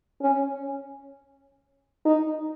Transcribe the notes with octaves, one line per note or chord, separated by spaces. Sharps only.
C#4
D#4